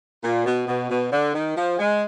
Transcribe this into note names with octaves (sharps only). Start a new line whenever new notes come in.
A#2
B2
B2
B2
D3
D#3
F3
G#3